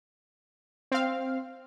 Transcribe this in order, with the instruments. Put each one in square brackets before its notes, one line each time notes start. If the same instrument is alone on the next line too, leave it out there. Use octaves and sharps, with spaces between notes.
[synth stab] C4 F5